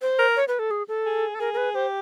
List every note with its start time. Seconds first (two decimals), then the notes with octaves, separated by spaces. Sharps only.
0.02 C5
0.19 A#4
0.36 C#5
0.48 B4
0.59 A4
0.71 G#4
0.88 A4
1.06 G#4
1.35 A4
1.40 G#4 A#4
1.54 A#4
1.57 B4
1.74 G4 C5